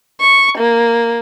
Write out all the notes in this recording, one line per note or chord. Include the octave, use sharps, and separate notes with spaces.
C#6
A#3